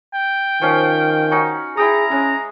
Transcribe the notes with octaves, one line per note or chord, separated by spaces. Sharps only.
G5
D#3 F3 C#4 F5
C#4 D#4 F#4
E4 G#4 G5 A#5 D#6
G#3 C#4